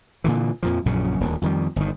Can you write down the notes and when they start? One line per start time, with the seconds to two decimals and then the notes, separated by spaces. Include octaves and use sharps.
0.24 A#2 D3 E3
0.63 F2 A#2 F3
0.86 A#1 F#2 A#2 C#3
1.20 D#1 D2
1.42 F2 D#3 G3
1.76 G1 D#3